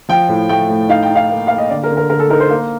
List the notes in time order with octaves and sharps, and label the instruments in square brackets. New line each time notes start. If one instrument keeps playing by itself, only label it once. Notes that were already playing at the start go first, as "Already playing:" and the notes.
[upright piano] F3 G5
A2
A3 G5
A2
D#4 F5
G5
D#4
F5
A#3
A#3 F5
D#5
D3 D5
A#4
D3
A#4
D3 A#4
A4
D#4 A#4
C5
A#3